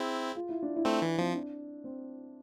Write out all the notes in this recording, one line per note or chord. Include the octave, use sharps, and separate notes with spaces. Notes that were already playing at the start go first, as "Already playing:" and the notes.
Already playing: C4 E4 G#4
F4
E4
D4
E4
A3 C4
E3
F3 C4
D4
C4